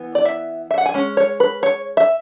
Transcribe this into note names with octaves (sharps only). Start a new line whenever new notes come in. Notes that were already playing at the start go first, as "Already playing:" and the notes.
Already playing: E3 B3
D5
E5
E5
F#5
G#5
G#3 C#4
C#5
B4
C#5
E5